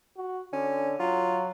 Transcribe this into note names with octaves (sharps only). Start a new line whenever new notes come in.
F#4
D3 C#4
F#3 F4